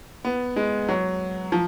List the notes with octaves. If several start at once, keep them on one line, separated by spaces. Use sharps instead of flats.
B3
G#3
F#3
F3